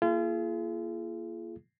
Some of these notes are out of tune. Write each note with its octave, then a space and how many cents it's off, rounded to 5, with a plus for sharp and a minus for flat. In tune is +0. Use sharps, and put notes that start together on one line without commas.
A#3 +0 F4 -35 G#4 +35